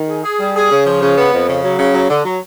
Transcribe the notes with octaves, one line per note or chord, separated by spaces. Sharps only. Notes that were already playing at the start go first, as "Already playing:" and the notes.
Already playing: D#3
G#4
G#4
G3
G#4
C#3
F3
C#3
B3
F2
C#3
F#3
C#3
F#3
D3
F#3